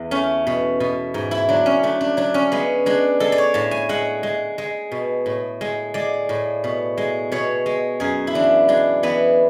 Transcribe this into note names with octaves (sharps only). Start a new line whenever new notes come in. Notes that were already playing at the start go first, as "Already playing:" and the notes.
Already playing: E2
A3 C#4
B2
B2
G#2
E4
F#3 D4
C#4
A3 D4
D4
F#3 D4
C#4
G#3 B3
G#3 D4
G#3 A4
D5
C#5
A2 A5
G#5
G#3 F#5
G#3
G#3
B2
A2
G#3
G#3 D5
A2
B2
G#3
B2 C#5
G#3
F#2 G#4
E4
E3 D4
G#3 D4
E3 B3